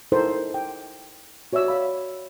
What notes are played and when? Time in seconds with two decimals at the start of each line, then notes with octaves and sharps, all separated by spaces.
0.12 D#4 E4 A4 A#4 C5
0.54 G5
1.53 F#4 C#5 D5 E5 E6
1.68 F5 B5